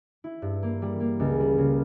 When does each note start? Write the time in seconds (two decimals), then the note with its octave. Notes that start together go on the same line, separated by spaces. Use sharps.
0.24 E4
0.42 G2
0.63 A#3
0.82 G3
1.00 A#3
1.20 C#2
1.40 G3
1.58 C#3